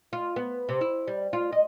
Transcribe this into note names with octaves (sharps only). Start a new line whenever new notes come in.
F4
B3
C3
E4
G3
F4
D#5